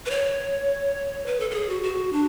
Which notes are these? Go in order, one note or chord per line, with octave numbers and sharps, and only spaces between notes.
B4
C#5
B4
A4
A4
G#4
F#4
F#4
D4